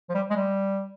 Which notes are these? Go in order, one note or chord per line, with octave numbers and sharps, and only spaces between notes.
F3
G3
G#3
G3